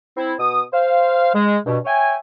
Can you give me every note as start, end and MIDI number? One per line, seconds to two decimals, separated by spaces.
0.17 0.34 60
0.17 0.34 64
0.39 0.62 47
0.39 0.62 87
0.73 1.30 72
0.73 1.30 77
1.33 1.58 56
1.66 1.78 43
1.66 1.78 47
1.85 2.16 73
1.85 2.16 76
1.85 2.16 79
1.85 2.16 80